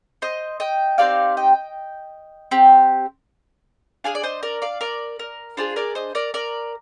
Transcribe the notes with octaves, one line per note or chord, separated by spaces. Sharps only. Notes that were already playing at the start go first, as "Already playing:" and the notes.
C5 D#5
D#5 G5
C4 D#4 G4 D5 F5
D#5 G5
C4 G4
D4 G#4 F5 G#5
D5
C5 D#5
A#4 D5
D5 F5
A#4 D5
A#4
D4 F4 G#4 C5
A#4 D5
C5 D#5
A#4 D5
A#4 D5